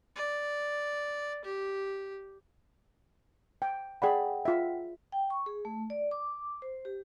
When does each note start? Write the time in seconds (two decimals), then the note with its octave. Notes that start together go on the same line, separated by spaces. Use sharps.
0.16 D5
1.44 G4
3.62 G5
4.02 G#4 D5 F#5 G5 B5
4.45 F4 E5
5.12 G5
5.30 C#6
5.46 G#4
5.65 A3
5.90 D5
6.11 D6
6.62 C5
6.85 G4